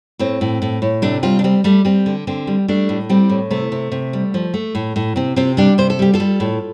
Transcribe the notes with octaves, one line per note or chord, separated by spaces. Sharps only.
A2 C4
A2
A2
A2
C3 A3 D4
G3 C4 F4
D4
G3 C4
G3 A3
G3 C4
D3
D3 C4
G3
G3 A3 D4
A2
G3 C4
A2
C3 A3
C3
C3
G3
F3
A3
A2
A2
C3 C4
C3 C4 F4
G3 D4 G4
C3 C5
A4
G3 G4
F4 A4
G3
A2